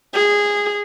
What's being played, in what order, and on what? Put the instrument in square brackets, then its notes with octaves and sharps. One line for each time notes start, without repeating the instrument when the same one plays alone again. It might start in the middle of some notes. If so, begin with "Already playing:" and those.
[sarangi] G#4